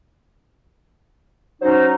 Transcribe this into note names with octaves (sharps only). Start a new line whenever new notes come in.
F#3 C#4 D#4 C5